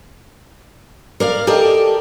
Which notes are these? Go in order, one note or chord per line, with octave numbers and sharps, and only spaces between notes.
A#4 D5 F5
G4 A4 A#4 D5 D#5